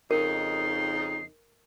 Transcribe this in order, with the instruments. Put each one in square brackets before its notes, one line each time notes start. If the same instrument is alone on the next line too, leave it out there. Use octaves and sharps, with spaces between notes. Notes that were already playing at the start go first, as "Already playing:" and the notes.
[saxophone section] F2 C#3 D#4 [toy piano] A#4 [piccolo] C7